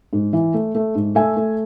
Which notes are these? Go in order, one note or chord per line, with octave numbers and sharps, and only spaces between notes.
G#2
E3
A3
A3
G#2
A3 E5 G#5
A3